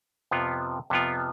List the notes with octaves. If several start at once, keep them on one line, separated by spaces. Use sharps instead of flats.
F2 C3 F3 B3 F4
F2 C3 F3 B3 F4